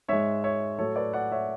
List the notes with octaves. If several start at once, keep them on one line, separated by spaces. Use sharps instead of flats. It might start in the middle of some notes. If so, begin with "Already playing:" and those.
G#2 G#3 C#5 E5
C#5 E5
A2 F#3 A4 C#5
B4 D5
D5 F#5
C#5 E5